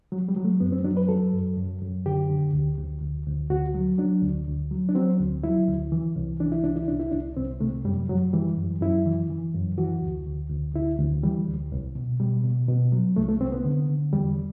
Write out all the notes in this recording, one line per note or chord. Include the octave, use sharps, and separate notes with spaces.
F#3
G3
F#3
A3
F#2 B3
C4
F#3 D4
B4
F#3 A4
F#2
F#2
F#2
D3 G4
D3
D2
D2
D2
D2
D2 F#4
F#3
F#3 D4
D2
D2
F#3
D4
F#3 C4
D2
F#3 E4
D2
E3
C2
E3 D4
E4
C2 D4
E4
C2 D4
E4
C2 D4
C2 C4
C3 A3
F#2 G3
F#2 F#3
E3 G3
F#2
F#2 E4
E3
E3
F#2
E3 F#4
D2
D2
D2
D2 E4
D2
E3 G3
D2
C2
B2
B2 G3
B2
B2
F#3
C2 A3
A3
C2 C4
B3
D3
D3
E2 G3